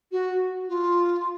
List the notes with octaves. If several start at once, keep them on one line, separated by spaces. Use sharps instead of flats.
F#4
F4